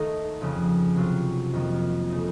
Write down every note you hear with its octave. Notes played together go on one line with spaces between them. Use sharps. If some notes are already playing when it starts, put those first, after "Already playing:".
Already playing: D#2 D#3 A3 D#4
F2 C#3 F3
C3 F#3 C4 F4
F2 D#3 A#3
C#3 A3 D#4